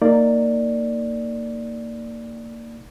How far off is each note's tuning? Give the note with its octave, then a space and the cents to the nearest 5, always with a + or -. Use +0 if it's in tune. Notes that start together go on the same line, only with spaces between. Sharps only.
A#3 -20 D#4 -5 D5 +0